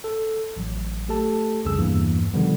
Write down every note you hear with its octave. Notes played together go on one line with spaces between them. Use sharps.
A4
A1 F#3
A3 G4 A4 A5
C2 F2 C#3 G#4 E6
E2 G2 E3 A#3
B2 D3 D#3 F3 G3 B3